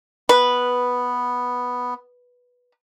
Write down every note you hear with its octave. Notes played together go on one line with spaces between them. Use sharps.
B3 B4